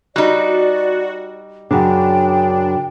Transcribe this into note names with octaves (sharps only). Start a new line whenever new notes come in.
G3 D#4 F#4 D5
F#2 C#3 D4 G5